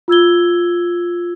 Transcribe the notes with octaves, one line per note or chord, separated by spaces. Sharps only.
F4 E6 G#6 G7